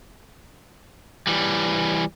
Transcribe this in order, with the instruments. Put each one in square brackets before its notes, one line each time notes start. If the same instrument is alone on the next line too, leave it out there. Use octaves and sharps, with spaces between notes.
[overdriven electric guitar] E3 G3